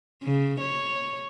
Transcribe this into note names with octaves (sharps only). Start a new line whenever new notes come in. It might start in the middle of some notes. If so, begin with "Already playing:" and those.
C#3
C#5